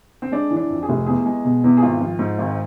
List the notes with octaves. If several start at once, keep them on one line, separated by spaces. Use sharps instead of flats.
C4
G#3 D4
E3
D4
F2
G#4
F1
E2 G#4
G#3
B2
E2
G#4
G#1 F4
F3
G#2
G#1